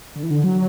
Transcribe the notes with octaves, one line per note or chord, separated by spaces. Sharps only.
D3
E3
D3
F#3